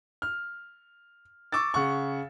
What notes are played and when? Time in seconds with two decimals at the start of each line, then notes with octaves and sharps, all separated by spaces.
0.22 F6
1.52 C#6 D6 E6 A6
1.74 C#3 F#5 C#6